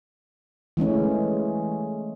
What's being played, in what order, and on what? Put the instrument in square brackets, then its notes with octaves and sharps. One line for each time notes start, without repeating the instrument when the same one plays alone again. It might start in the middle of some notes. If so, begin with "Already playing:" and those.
[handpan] E3 G#3 A3 C#4